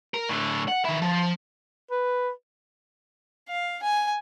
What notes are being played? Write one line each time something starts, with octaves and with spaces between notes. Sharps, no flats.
A#4
A2 D3
F#5
D#3 E4
F3
B4
F5
G#5